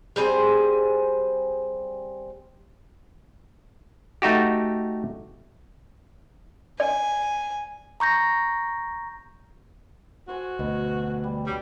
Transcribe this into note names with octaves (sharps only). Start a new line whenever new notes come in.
G3 C4 G#4 C5
A3 D#4 F#4 G4
D5 G#5
A#5 C#6 G6 A#6
F#4 A4 C5 G#5
D2 B2
G3
F#3 G3 D5